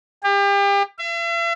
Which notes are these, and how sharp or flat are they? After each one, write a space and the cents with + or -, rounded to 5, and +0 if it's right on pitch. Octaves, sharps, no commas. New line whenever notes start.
G4 +35
E5 +45